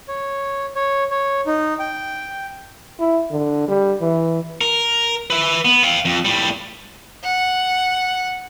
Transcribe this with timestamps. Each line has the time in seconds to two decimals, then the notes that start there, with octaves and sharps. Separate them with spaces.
0.08 C#5
0.75 C#5
1.11 C#5
1.47 D#4
1.79 G5
3.00 E4
3.31 D3
3.68 G3
4.01 E3
4.61 A#4
5.30 B4 E5
5.65 B3
5.84 F5 G5
6.05 F2
6.25 A2 G3
7.24 F#5